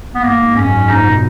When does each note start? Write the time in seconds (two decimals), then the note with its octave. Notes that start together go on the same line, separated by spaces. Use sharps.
0.15 B3
0.23 G#2 A#3
0.40 G#2
0.56 F#2 C#4
0.73 G#2
0.89 A#2 D#4
1.06 B2